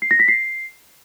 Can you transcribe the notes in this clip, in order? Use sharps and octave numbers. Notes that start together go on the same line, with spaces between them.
C7
A#6
B6
C7